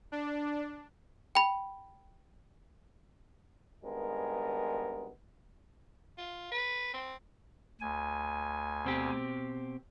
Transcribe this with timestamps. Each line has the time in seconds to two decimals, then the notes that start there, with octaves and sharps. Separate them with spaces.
0.12 D4
1.35 G5 B5
3.84 G#1 G2 G#3 B3 A#4
6.18 F4
6.51 B4
6.93 C4
7.81 D2 G#5
8.85 B2 C4 G4